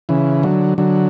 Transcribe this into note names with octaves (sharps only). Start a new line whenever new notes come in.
C#3 E3
D3 F#3
D3 F#3